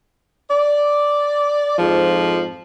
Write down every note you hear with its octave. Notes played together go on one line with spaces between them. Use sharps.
D5
F2 G#2 F3